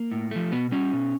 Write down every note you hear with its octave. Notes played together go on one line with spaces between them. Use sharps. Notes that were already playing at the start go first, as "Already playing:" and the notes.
Already playing: A#3
A2
F3 A3
B2 B3
G3 C#4
B2